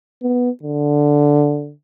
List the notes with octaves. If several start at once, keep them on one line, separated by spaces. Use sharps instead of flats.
B3
D3